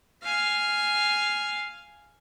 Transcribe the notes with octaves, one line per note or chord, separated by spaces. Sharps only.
F5 G#5